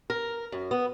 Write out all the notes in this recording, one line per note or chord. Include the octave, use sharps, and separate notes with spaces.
A#4
F#2
B3